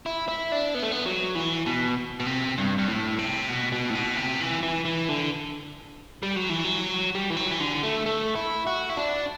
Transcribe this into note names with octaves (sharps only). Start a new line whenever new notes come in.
E4
E4
D4
B3
A3
B3
F#3
E3
B2
B2
C3
G2
G2
A2
C3
B2
B2
A2
B2
C3
E3
E3
E3
D3
G3
F#3
E3
F#3
G3
E3
F#3
E3
D3
A3
A3
E4
F#4
E4
D4